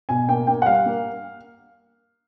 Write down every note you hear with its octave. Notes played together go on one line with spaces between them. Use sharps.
B2 G#5
A#3 G5
A#3 G5
F#5
G3 F5
A#3